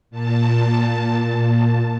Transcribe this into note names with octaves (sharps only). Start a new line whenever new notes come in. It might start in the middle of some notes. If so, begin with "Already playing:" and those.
A#2 A5